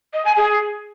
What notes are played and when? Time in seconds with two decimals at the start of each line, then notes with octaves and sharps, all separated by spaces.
0.13 D#5
0.25 G#5
0.37 G#4